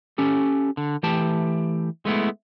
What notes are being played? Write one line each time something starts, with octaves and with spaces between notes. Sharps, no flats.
C#4 G4 A4
D3
E3 A3 G4 G5 A5
G#3 A3 B3 E4